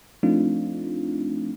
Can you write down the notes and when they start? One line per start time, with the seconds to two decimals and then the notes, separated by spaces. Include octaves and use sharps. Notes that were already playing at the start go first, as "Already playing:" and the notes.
0.23 F3 A3 C4 D4 D#4 F4